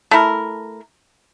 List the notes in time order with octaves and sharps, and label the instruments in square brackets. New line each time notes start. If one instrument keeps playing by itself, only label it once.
[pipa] A3 E4 A#4